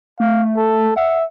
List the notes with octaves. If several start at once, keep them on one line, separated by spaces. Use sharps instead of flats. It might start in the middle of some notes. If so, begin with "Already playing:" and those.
A3 F5
A4
E5 F#5